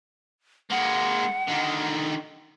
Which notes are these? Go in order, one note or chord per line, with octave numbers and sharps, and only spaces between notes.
G#3 A#3 F#5
D3 D#3